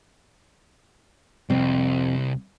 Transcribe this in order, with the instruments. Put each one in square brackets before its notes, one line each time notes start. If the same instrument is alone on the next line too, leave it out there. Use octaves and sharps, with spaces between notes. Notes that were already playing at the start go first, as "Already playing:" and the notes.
[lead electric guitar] C2 [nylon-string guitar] F2 C4